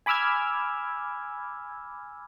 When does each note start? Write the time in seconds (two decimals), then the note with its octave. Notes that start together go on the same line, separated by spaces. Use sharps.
0.06 G#5 B5 D6 E6 F6 G#6